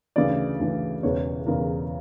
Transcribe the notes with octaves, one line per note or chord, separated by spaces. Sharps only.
D2 C#3 E3 D5
D2 C#3 E3
E1 E2 C#3 E3 C#5
E1 E2 C#3 E3 A#4